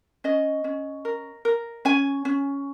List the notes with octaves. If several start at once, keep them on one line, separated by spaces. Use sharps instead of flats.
C#4 D#5
C#4
A#4
A#4
C#4 G#5
C#4